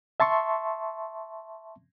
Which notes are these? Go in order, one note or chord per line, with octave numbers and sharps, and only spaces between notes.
E5 A5 C6 C#6